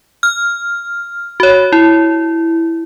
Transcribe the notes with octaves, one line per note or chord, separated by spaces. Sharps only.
F6
F#4 C#5
E4